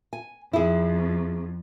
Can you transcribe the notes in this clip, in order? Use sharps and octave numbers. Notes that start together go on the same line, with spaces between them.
G#5
F2 E4 G#4